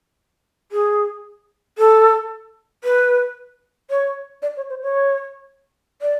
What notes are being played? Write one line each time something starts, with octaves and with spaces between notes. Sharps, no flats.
G#4
A4
B4
C#5
D5
C#5
C5
C#5
D5